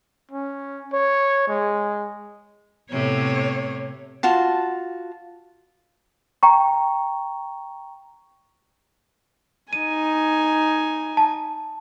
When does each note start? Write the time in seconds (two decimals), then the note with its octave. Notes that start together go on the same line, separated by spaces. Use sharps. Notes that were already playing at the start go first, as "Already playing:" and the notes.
0.31 C#4
0.93 C#5
1.48 G#3
2.91 A2 C3 B3 C#5
4.23 F4 F#4 A5
6.43 G5 A#5 C#6
9.73 D#4 G#5 D#7
11.17 A5